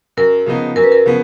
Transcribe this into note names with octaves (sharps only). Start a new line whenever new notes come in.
F#2 A#4
C#3 F3 B3 D#4
F#2 A#4
B4
A#4
C#3 F3 B3